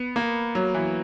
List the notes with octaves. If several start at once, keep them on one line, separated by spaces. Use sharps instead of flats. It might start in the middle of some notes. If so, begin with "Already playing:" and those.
Already playing: B3
A#3
F#3
E3